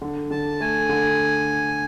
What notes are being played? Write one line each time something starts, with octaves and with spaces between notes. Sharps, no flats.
D3
D3 A5
A3 G#5
D3